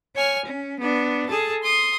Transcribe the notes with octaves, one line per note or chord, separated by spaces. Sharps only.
C#5 G#5 F6
C#4
B3 D4
G#4 A4 A5
C6 D#6